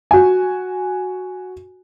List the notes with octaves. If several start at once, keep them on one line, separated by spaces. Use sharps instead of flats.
F#4 G#5